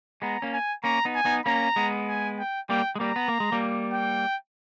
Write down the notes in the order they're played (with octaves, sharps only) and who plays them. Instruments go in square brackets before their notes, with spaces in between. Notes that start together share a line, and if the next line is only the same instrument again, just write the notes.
[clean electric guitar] G#3 B3 [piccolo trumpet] A#5
[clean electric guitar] A#3 C#4
[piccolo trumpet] G#5
[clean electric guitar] A#3 C#4 [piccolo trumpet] A#5
[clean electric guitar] B3 D#4
[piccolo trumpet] G#5
[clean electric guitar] B3 D#4
[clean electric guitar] A#3 C#4 [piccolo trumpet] A#5
[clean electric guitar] G#3 B3
[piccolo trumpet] G#5
G5
[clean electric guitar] G3 A#3 [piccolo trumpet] G5
[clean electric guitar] G#3
[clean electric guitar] G3 A#3 [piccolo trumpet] A#5
[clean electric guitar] B3
A#3
G#3
G3 A#3
[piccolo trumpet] G5